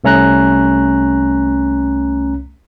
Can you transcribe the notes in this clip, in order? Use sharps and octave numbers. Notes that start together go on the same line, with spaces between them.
C2 A3 C#4 A#5 F#6